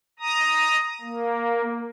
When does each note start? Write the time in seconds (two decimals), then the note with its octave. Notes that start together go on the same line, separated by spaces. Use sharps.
0.19 A#5 D#6
1.01 A#3